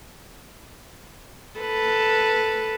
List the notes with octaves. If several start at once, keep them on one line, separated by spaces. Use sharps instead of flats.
A4 B4